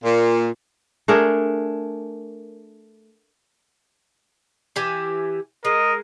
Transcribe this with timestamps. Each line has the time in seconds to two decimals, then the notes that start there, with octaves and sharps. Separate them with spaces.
0.03 A#2
1.08 A3 D4 G#4 A#4
4.76 E3 G4 G#5
5.65 G#3 A#4 D#5